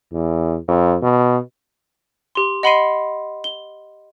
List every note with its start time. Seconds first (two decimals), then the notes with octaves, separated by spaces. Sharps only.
0.13 E2
0.68 F2
1.02 B2
2.35 G4 C6
2.63 D#5 F#5 B5 C6 C7 D#7
3.44 G7